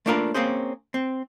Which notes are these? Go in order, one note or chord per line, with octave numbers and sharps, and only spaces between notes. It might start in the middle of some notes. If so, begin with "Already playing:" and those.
A3 A#3 D4 F4 A#4 B4
A#3 C4 C#4 G#4 C5
C4